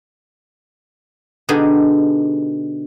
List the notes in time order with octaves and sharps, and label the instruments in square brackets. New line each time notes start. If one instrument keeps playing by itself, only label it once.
[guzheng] B2 D3 D4 D#4 G4 G#4